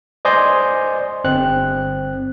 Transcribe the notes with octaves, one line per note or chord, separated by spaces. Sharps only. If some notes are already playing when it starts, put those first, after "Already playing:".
C5 D5 D#5 G#5 C6 G6
G1 C4 F#6